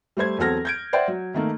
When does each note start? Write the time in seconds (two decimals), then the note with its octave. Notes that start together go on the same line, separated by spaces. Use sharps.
0.17 G3 A3 C5 G#6
0.38 E2 F#3 C4 A4 F6 A#6
0.65 G6 G#6 D7
0.93 C5 D5 E5 F#5 G5
1.08 F#3
1.34 D#3 A3 A#3